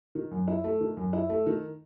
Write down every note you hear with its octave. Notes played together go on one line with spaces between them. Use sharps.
D#3
F#2
E4
A3
D#3
F#2
E4
A3
D#3